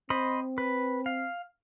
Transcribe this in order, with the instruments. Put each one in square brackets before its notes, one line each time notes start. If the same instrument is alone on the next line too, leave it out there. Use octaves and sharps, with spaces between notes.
[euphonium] C4 [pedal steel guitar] C5 D#5 B5
[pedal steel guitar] B4
F5